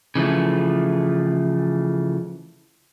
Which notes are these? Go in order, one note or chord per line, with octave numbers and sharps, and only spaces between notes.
C#3 E3 F3 A3